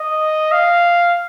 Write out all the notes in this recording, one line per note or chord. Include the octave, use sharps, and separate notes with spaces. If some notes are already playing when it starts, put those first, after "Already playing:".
Already playing: D#5
F5